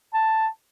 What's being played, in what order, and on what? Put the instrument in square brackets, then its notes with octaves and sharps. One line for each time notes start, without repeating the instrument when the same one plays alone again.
[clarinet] A5